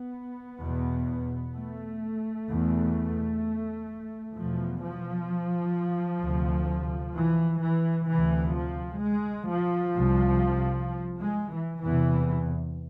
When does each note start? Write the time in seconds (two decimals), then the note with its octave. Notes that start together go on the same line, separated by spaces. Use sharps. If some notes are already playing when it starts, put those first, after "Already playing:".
Already playing: B3
0.63 E2 B2
1.55 A3
2.50 E2 B2
4.36 E2 B2 F3
4.82 F3
6.23 D2 C3
7.17 E3
7.64 E3
8.09 D2 C3 E3
8.56 F3
9.03 G#3
9.51 F3
9.96 C2 C3
11.21 G#3
11.52 E3
11.84 E2 C3 E3